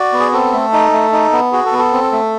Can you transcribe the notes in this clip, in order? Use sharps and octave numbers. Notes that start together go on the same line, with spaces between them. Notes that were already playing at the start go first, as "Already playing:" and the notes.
Already playing: F#4 D5
B3
G#4
C4 A4
A3
D#4
A3
D#4
B3
F#4 G#4
A4
B3
A4
C4
A3